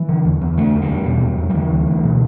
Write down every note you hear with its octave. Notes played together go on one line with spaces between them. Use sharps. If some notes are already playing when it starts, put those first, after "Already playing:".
Already playing: E3
D3
E2
E2
D3 A3
E2
G3
E2
B2
E2
E2
G3
D3 E3
D2
D2
B2